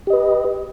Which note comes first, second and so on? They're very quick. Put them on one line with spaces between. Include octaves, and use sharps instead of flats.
G4 D#5 B4